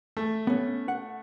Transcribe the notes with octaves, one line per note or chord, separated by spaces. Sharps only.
A3
B3 C#4
F#5